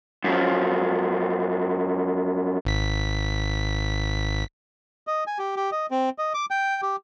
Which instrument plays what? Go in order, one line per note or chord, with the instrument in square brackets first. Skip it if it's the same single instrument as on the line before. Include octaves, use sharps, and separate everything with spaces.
[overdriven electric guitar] F#2 F3
[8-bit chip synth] G#1 B6
[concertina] D#5
G#5
G4
G4
D#5
C4
D#5
D6
G5
G4